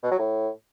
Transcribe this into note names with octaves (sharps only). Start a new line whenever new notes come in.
B2
F#3
A2